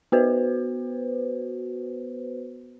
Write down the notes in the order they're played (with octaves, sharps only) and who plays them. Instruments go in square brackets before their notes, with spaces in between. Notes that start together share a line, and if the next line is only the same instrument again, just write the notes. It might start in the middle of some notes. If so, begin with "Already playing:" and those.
[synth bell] B3 F#4 B4 C5